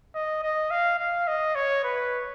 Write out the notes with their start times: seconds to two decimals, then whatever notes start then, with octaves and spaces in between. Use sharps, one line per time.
0.15 D#5
0.43 D#5
0.71 F5
0.99 F5
1.28 D#5
1.56 C#5
1.84 B4